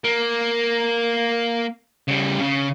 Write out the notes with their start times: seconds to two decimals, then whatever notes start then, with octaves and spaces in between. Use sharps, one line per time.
0.04 A#3
2.08 C#3 G3
2.40 C#3